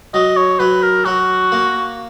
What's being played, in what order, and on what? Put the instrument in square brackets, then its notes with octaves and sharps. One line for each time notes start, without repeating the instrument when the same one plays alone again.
[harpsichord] F#3 [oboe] D#5
[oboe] C#5
[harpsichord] F#3 [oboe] B4
[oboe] A#4
[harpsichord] F#3 [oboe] F#4
[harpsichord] A#3